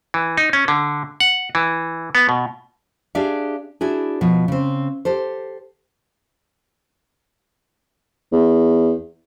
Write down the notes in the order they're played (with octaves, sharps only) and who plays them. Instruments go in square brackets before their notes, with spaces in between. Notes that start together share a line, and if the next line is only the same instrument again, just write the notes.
[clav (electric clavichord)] E3
D#4
C#4
D3
F#5
E3
B3
B2
[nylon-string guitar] D4 G4 G#4 D5 E5 F5
D4 E4 F#4 G#4
B2 F3
C#3 C4
G4 A4 C5
[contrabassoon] E2